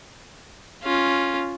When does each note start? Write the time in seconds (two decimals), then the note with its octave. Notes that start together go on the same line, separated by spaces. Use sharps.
0.83 C#4 F4